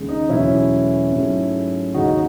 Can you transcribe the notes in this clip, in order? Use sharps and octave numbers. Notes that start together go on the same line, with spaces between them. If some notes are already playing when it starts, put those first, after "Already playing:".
Already playing: D#2 C#3 G#3
D#4
E2 B2 F#3 A3 C#4 E4
G#2 F#3 A3
D#2 C#3 G#3 D#4 F#4